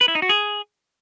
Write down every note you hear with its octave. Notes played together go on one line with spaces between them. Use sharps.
B4
E4
D#4
F#4
G#4